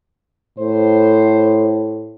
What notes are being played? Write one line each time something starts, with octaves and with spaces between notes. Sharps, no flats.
A2 C5